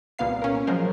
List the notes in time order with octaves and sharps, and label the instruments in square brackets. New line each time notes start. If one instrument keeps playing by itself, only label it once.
[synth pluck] C2 A#2 B3 F5 C7
C#4 A#4
F3 F#3 G#3 A#4 C5